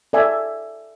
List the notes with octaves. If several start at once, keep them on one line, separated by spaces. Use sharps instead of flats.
A4 D5 E5 G#5